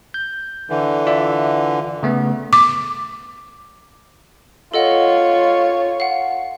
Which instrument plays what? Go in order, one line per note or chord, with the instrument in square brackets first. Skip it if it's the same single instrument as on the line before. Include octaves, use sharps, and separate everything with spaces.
[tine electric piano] G6
[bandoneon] D3 E3
[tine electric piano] F4 D5 E5
C#3 A3 B3
[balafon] D6
[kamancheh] F4 C#5 [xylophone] A4 D#5 F#5
[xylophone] F5 F#5